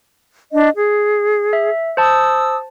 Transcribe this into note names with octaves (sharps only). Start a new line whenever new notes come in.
D4 D#5
G#4
E5
C5 A5 D#6 E6